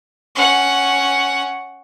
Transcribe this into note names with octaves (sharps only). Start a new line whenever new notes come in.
C#4 F#5